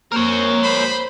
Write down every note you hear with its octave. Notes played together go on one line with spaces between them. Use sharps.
A#3 C4 A#4 C5 C#5
C5 B5